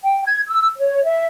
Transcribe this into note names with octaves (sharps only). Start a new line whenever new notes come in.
G5
G#6
E6
C#5
E5